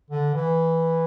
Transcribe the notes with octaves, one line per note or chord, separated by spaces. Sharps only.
D3
E3